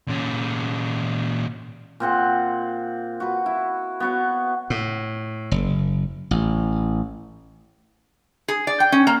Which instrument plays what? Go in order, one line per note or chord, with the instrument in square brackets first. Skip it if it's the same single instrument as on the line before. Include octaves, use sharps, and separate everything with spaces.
[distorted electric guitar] A#2 C#4
[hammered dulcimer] A#2 C4 F#5 C6
F#4 B4
E4
B3 F#4 C#5
[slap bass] A2
F#1
A1
[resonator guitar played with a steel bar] G#4
D5
G5
C#4
A#3